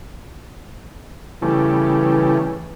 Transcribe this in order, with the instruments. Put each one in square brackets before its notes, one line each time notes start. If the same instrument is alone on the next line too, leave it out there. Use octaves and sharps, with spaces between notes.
[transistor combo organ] C#3 G3 A3 [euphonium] E3